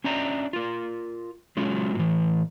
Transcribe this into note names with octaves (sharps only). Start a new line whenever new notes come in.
C#4 D4 E5 G5 A#5
F4 A#4
F#3 G#3 C#4 F4
A2 E3